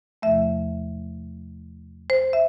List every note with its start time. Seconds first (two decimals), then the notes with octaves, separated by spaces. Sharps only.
0.22 E2 C3 F3 A3 E5
2.10 C5
2.33 E5